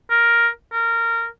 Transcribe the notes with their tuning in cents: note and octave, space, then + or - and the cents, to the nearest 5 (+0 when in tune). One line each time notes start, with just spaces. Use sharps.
A#4 +5
A#4 -15